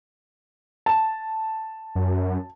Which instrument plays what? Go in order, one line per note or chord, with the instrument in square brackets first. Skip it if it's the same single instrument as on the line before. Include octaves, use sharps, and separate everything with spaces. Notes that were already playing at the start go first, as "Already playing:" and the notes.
[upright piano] A5
[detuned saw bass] F#2